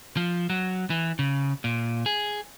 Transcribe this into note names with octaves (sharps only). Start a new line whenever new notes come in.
F3
F#3
E3
C#3
A#2
G#4